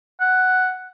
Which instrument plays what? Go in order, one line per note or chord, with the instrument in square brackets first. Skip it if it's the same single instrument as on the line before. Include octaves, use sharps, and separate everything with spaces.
[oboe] F#5